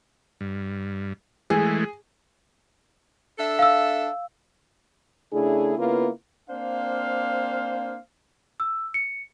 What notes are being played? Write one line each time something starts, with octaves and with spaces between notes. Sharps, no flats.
G2
E3 G#3 A3 G#4
D4 A4 E5
F5 E6
C#3 A3 D4 E4 G#4
C#3 A#3 B3 E4 F4 B4
A#3 C4 D4 C5 F5
E6
C#7